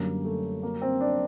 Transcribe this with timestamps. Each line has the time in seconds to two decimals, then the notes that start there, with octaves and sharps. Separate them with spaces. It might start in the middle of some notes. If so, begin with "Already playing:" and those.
Already playing: F#2 D3 G3 A#3
0.25 A3
0.63 A#3
0.81 C4
1.01 D4